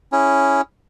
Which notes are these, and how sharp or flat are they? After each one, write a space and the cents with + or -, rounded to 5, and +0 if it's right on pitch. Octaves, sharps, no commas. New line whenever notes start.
C#4 +0 E4 +0 G#4 +0